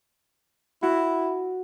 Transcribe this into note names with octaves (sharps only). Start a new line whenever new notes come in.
E4 F#4